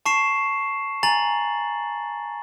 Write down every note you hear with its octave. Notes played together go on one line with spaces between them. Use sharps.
A5 C#6 C7 E7
G#5 A#5 A6 F#7